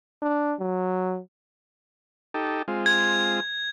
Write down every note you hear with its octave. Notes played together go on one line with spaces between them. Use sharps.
D4
F#3
D#4 G4 A4
G#3 C4 F4
G#6